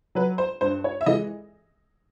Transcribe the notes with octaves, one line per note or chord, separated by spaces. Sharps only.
F#3 B4
C5
G2 C5
C#5
E5
E3 G#3 D#5